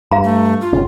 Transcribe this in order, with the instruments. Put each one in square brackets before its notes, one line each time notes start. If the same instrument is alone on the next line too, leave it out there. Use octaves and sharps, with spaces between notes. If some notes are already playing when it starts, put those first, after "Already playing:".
[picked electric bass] G2 [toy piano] F5 A#5
[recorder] A3
F4
[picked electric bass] G1 C#3 C#4